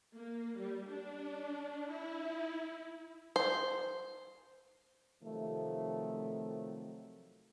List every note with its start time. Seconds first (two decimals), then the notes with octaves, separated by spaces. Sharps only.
0.15 A#3
0.58 G3
0.89 D4
1.91 E4
3.36 C5
5.23 C3 D#3 F3 F#3 A3